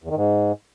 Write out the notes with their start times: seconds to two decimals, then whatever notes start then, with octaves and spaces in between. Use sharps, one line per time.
0.04 E2
0.10 D#3
0.16 G#2